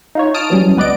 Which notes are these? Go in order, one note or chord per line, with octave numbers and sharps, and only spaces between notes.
D#4 F4 C#5
A5 D#6 F6 D7
E3 F#3 G3 C#4
C#2 B3 B4 D5 D#5 D7